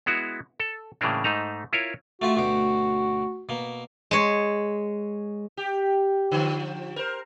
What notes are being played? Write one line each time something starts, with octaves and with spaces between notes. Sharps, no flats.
G#3 B3 E4 F#4
A4
A2 C#3 E3 A#3 D4
G#2 A3 D#4 A#5
E4 F4 A#4 C#5
A3 F4 F#4 E5
D2 B2 F#4 G4
B2 A#3
G#3 C#5
G4
D3 F3
A#4 C5